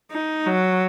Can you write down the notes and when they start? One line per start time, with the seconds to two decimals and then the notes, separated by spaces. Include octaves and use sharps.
0.11 D#4
0.46 F#3